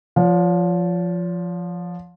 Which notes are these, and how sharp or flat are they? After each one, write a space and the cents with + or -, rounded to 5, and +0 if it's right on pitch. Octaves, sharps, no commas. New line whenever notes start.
F3 +0 C#5 +40 F5 +40